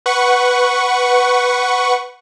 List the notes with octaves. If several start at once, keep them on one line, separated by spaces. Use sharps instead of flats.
B4 F#5 C#6